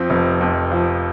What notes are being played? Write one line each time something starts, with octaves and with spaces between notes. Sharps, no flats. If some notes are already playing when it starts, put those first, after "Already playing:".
Already playing: F2 F3 C4
F1
F2
F3